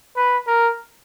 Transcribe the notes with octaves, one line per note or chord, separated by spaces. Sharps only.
B4
A#4